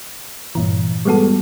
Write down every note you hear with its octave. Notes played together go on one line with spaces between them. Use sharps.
G2 A#2 E3
G3 G#3 B3 F#4 A4